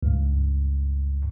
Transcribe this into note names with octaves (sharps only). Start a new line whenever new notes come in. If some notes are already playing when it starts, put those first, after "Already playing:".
C#2 G2